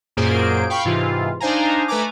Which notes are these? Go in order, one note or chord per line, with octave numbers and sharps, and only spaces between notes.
F#2 A#2 A#3 G#4 C5 D7
F5 G5 B5 C#6
G#2 C3 E3 F4
D4 D#4 C5 F5 G#5 A#5
A3 B4 G#5 A#5 D6